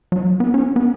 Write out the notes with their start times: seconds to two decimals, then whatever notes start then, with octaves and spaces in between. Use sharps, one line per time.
0.12 F#3
0.40 B3
0.54 C#4
0.76 B3